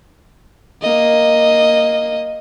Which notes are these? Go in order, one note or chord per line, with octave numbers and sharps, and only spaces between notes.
A#3 D#5